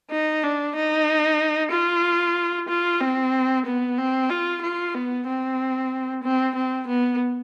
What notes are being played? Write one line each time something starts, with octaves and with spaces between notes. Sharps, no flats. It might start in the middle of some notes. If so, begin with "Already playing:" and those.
D#4
D4
D#4
F4
F4
C4
B3
C4
F4
F4
B3
C4
C4
C4
B3